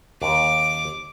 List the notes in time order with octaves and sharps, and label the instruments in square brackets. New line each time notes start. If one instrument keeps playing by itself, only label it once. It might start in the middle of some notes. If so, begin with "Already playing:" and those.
[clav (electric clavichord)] D#2 [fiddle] D6